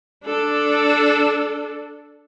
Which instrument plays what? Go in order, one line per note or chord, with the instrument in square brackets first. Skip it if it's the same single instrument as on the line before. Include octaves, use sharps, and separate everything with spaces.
[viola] D4 A4